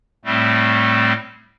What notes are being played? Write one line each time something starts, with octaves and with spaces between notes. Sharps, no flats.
A2 G3 A3 C4